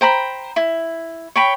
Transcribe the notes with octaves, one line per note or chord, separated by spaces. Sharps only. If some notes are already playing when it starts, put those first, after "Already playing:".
C5 G5 A#5 B5
E4
C#5 G5 B5